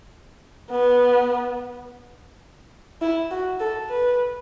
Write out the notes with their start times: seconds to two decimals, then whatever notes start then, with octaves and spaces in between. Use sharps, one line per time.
0.70 B3
3.02 E4
3.30 F#4
3.60 A4
3.89 B4